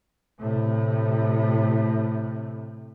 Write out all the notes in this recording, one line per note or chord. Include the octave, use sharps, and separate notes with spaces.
A2 C3